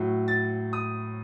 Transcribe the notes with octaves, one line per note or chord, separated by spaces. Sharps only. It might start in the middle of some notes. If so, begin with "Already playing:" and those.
Already playing: A2 F#3
A6
D#6